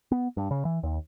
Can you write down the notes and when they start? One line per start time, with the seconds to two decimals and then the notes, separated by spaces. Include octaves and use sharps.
0.12 B3
0.37 G2
0.51 C#3
0.65 E3
0.83 D#2